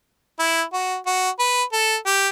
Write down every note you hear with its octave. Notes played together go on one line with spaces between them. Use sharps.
E4
F#4
F#4
B4
A4
G4